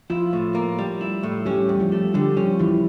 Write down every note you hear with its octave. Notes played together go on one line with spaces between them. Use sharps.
F3 E4 F4
A2
A#3
G3
E4
A2
G3 C#4 G4
E2
F3 F4
A3
D3 G3 G4
F3 C#4 F4
E2 E3 E4